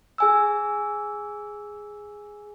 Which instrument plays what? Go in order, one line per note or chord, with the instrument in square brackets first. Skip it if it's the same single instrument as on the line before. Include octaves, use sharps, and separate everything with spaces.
[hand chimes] G#4 G#5 E6